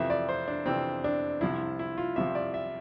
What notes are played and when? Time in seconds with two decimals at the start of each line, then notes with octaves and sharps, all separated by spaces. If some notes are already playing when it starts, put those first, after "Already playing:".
Already playing: F2 C3 E3 E5
0.10 D5
0.29 C5
0.48 D4
0.66 F2 C3 E3 C4
1.04 D4
1.41 C2 C3 F3 E4
1.79 E4
1.98 F4
2.16 C2 C3 F3 E5
2.35 D5
2.54 E5